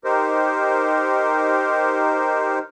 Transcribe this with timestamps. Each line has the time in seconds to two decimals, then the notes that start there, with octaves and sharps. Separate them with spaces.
0.04 D#4 G4 A#4 C5